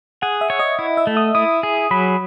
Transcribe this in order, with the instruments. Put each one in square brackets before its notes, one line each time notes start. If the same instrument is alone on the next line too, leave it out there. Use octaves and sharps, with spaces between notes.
[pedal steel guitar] G#4 [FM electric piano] F#5
[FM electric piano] E5
[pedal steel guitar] C#5
[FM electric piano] D#5
[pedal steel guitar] E4
[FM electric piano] E5
[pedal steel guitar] A3
[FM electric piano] D#6
[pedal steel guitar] E4 [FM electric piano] D#6
[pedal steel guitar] G#4
[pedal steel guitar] F#3 [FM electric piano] B5